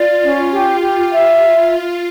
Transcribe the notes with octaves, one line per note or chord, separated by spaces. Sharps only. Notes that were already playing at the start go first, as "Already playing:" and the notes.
Already playing: F4 D5
C#4
G4
G4
E5